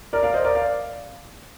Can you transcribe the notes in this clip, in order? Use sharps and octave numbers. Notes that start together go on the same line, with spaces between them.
A#4 D5
D5 F5
C5 D#5
A#4 D5
D5 F5